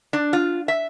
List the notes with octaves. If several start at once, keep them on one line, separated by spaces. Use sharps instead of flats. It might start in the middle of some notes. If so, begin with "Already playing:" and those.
D4
F4
E5